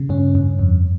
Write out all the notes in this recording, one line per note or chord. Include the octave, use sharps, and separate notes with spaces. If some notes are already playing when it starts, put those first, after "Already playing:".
Already playing: C#3
G2 C#4
G2
F2